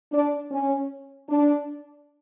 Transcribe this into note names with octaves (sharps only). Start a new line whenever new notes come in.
D4
C#4
D4